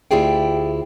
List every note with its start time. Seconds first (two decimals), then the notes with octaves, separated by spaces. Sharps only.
0.11 D2 E4 F4 G4 G#4 G5